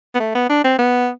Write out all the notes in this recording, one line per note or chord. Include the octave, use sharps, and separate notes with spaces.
B3
A3
B3
D4
C4
B3